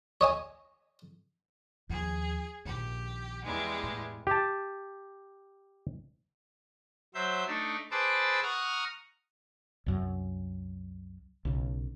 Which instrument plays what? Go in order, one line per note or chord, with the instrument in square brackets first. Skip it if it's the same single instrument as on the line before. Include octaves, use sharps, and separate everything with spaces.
[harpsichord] C#5 D#5 G#5
[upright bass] D#2 F3 [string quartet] G#4
[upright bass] A#1 D#3 [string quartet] G4
[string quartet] E2 G3 G#3
[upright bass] A2
[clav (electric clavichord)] G4 A5
[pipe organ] F#3 C5 E5 G6
A3 D4 D#4
G#4 B4 C5 A5 D6 E6
F#5 A#5 C#6 D#6 F6
[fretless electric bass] C2 F#2
B1 C#3